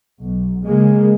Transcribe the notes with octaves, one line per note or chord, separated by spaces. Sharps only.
B1
C#3 G#3 A#3